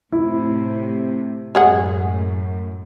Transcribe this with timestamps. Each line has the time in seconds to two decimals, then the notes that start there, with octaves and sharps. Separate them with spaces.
0.12 A2 C3 E4
1.55 F#2 A2 G#3 G#4 F#5